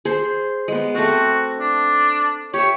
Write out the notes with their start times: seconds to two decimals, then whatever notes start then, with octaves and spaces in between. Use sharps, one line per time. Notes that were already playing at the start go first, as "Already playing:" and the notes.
0.05 G#4 C5
0.68 G#3 B3
0.95 A3 C4 F#4
1.59 D4
2.54 G4 C#5 E5